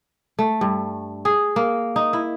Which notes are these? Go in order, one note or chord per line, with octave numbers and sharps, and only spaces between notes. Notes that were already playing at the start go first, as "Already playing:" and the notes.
A3
G2
G#4
A#3
D#4
E4